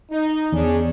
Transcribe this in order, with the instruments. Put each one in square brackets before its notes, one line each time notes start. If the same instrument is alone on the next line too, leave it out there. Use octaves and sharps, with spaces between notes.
[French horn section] D#4
[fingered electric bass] E2 [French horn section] C#4 D4 G#4